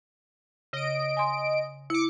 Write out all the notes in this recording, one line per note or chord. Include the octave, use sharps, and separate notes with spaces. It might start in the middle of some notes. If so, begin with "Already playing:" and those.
C#3 D#5 D7
G#5 C6
E4 D6 C#7